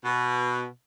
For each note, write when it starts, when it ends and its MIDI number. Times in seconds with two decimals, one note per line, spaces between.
0.04 0.66 47